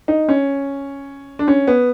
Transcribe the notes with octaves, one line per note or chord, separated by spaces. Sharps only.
D#4
C#4
D4
C#4
B3